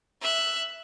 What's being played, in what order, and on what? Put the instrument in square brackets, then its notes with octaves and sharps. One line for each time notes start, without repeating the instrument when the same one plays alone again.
[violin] E5 F#6